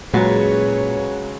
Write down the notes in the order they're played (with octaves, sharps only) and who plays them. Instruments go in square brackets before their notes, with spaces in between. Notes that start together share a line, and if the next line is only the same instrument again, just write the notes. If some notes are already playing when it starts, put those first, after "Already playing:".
[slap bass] A#2 [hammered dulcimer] C#3 A#5 [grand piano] F#3 G#3 F#4 [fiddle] B4 C#5